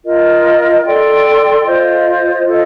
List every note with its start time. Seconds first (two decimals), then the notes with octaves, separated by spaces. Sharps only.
0.05 F4 A#4 D#5
0.85 A4 D5 G5 C6
1.65 F4 C5 D#5
2.45 F4 A4 D#5